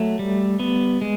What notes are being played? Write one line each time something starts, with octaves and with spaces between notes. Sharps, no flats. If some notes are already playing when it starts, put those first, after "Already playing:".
Already playing: F#3 A3
G3
B3
G#3